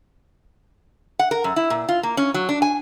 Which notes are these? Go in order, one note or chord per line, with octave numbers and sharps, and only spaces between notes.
F#5
A#4
F#2
E4
A#2
F4
A#3
C#4
F#3
D4
G#5